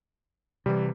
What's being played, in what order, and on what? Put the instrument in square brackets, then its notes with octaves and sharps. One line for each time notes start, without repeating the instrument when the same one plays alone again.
[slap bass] C3 E3 [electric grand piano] G3